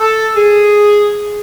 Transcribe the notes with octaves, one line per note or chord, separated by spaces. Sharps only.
A4
G#4